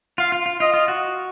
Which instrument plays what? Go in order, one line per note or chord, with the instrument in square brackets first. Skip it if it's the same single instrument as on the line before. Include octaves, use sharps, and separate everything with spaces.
[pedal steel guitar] F4 [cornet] F5
[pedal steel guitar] F4
F4
[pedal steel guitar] F4 [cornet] D#5
[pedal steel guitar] F4
F#4